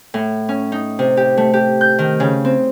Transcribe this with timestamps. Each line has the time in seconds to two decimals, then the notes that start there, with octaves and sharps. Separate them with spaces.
0.14 A2
0.49 C#4
0.72 D#4
0.99 C3
1.17 G4
1.37 A3
1.53 G4
1.81 G6
1.99 D#3
2.20 C#3
2.45 C4